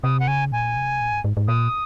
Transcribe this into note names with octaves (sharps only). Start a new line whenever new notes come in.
C3 D#6
F#5
C#3 G#5
A#2 G#5
C3
A#2
G#2
G#2
G#2
A#2 D#6